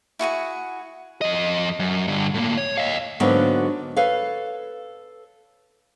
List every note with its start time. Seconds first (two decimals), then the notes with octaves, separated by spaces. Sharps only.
0.19 E4 F#4 G#4 F#5
1.21 F2 D#5
1.79 F#2
2.08 G2 D3
2.34 A2 A#3
2.58 C#5
2.78 D#5 F5
3.20 G#2 D3 F#3 A#3 B3 F#4
3.97 A4 B4 C#5 F5